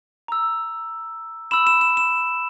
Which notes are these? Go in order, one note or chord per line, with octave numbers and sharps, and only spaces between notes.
A#5 E6
B5 E6 E7
E7
E7
E7